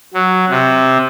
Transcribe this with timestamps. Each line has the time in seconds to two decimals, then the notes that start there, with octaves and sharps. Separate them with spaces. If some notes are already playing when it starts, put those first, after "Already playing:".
0.14 F#3
0.50 C3